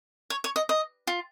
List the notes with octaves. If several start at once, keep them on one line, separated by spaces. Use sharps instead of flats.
C#5
C#5
D#5
D#5
F4